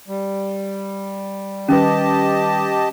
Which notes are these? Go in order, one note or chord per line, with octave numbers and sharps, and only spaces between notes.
G3
D#3 G3 C#4 G4 B4 D#5 A5